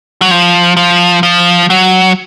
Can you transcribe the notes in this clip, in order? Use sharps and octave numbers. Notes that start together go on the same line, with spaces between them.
F#3
F3
F3
F3
F#3